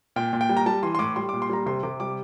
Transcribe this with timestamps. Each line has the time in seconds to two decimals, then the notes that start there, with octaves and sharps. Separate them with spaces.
0.16 A#2 G5
0.33 A#2
0.41 G5
0.49 G3
0.57 A#5
0.66 G3 A5
0.83 E3 C6
0.95 C6
0.99 A2 D6
1.16 G3 C6
1.29 D6
1.33 A#2
1.42 C6
1.50 G3 A#5
1.66 C3 C6
1.83 C3 D6
2.00 G3 D6